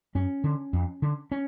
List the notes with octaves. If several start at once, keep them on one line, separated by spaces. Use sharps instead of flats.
F#2 C#4
D3
F2
D3
C#4